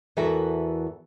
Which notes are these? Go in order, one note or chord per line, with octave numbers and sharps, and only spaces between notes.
E2 E3 F#4 A4 A#4 E5